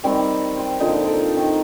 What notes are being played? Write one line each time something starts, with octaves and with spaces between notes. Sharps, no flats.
D#3 G3 C4
C5 G5
A#2 D3 F3 D#4
A4 A#4
D#3